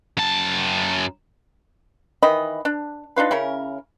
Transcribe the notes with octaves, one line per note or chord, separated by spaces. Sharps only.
F#2 A5
D#3 E3 D#5 B5
D4
D4 D#4 F4 B4
C#3 C#4 E4 A#4